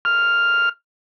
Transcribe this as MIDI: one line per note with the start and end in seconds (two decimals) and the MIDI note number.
0.05 0.69 89